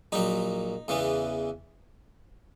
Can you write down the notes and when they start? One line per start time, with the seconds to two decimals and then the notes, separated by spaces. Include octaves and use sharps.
0.12 A#1 A#2 F#3 D#4
0.88 E2 C#3 E3 B3